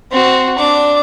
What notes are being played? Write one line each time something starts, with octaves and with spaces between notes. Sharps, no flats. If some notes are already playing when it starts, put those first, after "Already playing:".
C4 F#4
D4 D6